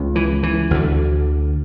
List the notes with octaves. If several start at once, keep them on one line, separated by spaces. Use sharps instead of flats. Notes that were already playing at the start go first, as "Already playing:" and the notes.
Already playing: C#2 C#3
E3
E3
D2 D3